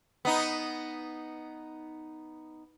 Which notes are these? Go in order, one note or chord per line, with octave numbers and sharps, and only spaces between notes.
B3 D#4